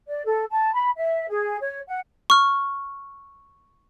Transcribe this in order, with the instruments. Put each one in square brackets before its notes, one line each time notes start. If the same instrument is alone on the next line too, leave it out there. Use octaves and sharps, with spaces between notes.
[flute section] D5
A4
A5
B5
E5
G#4
C#5
F#5
[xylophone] C#6 F6